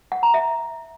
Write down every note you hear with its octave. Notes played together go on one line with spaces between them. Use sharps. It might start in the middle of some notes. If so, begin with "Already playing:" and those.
F#5
A#5
E5